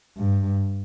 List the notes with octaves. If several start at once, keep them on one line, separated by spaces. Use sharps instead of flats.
G2